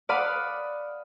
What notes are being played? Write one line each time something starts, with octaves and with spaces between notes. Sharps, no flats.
D5 F5 F#5 B5 D#6